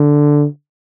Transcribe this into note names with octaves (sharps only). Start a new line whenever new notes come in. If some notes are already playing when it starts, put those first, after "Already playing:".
Already playing: D3